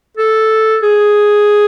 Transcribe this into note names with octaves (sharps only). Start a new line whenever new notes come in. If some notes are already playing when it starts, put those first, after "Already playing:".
A4
G#4